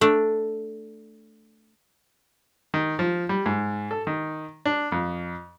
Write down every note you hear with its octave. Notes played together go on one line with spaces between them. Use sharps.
A3 D4
D#3
F3
G3
G#2
A4
D#3
D4
F2